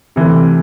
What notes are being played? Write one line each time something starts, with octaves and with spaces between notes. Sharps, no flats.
C3 E3 A3